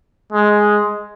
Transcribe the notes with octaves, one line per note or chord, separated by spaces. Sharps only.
G#3